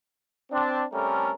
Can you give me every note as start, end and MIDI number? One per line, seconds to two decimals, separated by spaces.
0.52 0.83 60
0.52 0.83 62
0.93 1.30 48
0.93 1.30 55
0.93 1.30 57
0.93 1.30 61
0.93 1.30 69
0.93 1.30 70